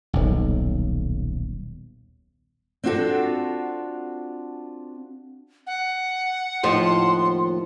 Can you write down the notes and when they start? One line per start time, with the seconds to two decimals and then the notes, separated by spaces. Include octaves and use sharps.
0.13 D#1 B1
2.84 C4 D4 F4 F#4 A4
5.67 F#5
6.63 D#2 A2 F3 C6